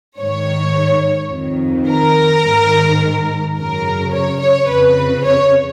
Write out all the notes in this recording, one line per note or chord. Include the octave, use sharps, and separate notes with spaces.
G#2 D#3 C#5
F2 D#3
A#4
G#2 D#3
F#2 C#3 A#4
C#5
C#5
F2 C#3 B4
C#5